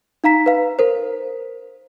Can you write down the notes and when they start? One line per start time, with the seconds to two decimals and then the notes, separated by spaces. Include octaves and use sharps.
0.24 D#4 F5 A#5 B6
0.46 B4 F5
0.79 A#4 C5